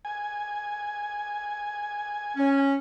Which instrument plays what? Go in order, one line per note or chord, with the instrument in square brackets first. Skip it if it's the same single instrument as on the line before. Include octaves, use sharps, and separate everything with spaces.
[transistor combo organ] G#5
[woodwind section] C#4